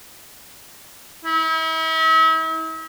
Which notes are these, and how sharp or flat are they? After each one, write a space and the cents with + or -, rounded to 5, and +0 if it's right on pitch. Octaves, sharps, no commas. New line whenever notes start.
E4 -40